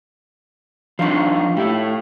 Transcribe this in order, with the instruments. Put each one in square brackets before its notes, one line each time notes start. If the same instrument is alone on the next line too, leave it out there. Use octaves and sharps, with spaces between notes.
[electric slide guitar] F3 D4 D#4 [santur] F5 C#6
[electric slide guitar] A2 E4 [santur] G4